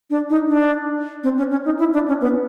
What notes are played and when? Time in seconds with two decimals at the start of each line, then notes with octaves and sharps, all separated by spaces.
0.10 D4
0.30 D#4
0.49 D4
1.23 C4
1.38 C#4
1.51 C#4
1.65 D#4
1.79 E4
1.93 D4
2.08 C#4
2.21 B3